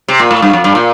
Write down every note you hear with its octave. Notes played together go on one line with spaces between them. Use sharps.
C3
A#2
A2
G2
F2
G2
A#2